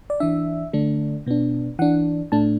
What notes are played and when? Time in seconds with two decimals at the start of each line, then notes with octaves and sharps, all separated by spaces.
0.10 D5
0.20 E3 D4 E5
0.73 D3 A3 D4
1.26 B2 B3 D4
1.79 E3 D4 F#5
2.32 A2 A3 D4 A5